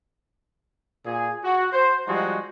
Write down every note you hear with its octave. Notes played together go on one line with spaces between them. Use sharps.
A#2 G#4
F#4
C5
F3 G3 G#3 D#4 F#4